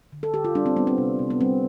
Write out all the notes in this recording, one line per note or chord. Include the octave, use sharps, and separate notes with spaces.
D3
A4
D3 G4
F4
G3 D4
C4
G3 B3
C4
C3
C3
B3
G3 C4